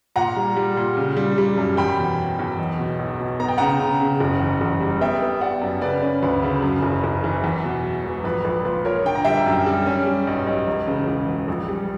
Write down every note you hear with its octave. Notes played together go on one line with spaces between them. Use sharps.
A#2 F#5 A#5
G3
G3
A#2
C#3
G3
G3
F#2
E2 G5 B5
B2
F#3
E2
B1
B2
B1
B2
B3 A#5
G5
C#3 F#5 A#5
C#3
C#3
F#1
E2
F#1
G3
B3 E5 G5
B3
B3 D5 F#5
F#2
C#3 B4 D5
C#4
D2 B4
C#3
F#2
F#1
F#1
E3
E2
B2
F#3
E1
A#1 B4
A#1 B4
A#2 B4
A#2 A#4 C#5
D3 G5
A#5
G3 E5 G5
F#2
G3
C#4
G3
B1
B1
E1
C#3
E1
E1
A#1
G3